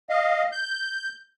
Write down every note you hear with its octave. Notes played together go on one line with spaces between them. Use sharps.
D#5 F5
G6